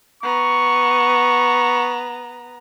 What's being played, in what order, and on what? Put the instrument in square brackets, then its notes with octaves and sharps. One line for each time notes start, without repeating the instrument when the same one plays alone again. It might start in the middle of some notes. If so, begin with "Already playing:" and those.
[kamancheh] B3 A#5 [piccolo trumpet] C#6